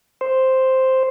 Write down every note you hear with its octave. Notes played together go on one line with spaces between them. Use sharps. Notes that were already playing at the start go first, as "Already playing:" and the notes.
C5